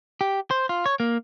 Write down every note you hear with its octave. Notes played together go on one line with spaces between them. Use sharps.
G4
C5
F4
C#5
A#3